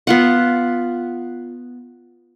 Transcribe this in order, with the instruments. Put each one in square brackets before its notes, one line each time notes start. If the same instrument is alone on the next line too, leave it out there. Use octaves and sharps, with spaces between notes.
[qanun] B3 F4 F#5